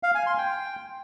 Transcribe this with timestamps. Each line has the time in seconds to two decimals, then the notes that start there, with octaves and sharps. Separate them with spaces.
0.03 F5
0.15 G#5
0.27 C6
0.38 G5